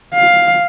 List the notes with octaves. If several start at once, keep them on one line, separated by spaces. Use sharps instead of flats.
F5